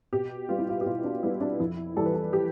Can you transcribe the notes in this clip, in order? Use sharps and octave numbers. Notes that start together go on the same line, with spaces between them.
B2 G4
G3 B3 F4
E4
F4
G4
B2 F4
D4
G3 B3 E4
D4
F2 E4
E3 G3 A4
B4
A4
G4